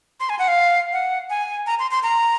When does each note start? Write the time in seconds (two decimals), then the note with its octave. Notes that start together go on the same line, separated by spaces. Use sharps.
0.20 C6
0.29 G#5
0.39 F#5
0.48 F5
0.93 F#5
1.30 G#5
1.66 A#5
1.79 C6
1.91 C6
2.03 A#5